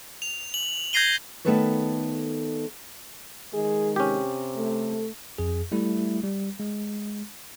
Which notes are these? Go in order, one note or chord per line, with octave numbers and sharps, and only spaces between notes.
F7
F#7
G6 G#6 A#6 C7 D#7 G7
D#3 A3 B3 A4 B4 C#5
D#3 G#3 G#4
C3 C#4 G4
A3
F2 G#4
G3 A3 E4
G3
G#3